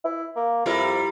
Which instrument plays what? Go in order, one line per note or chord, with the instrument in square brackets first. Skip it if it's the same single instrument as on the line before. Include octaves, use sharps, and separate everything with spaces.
[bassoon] E4
A#3
[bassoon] F2 [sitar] G3 E4 A#4